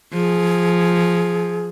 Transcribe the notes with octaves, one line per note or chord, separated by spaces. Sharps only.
F3 G#4